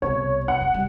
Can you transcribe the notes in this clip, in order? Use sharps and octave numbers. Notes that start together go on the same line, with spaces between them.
C2 B2 C#5
F#5
F1 A#3
G3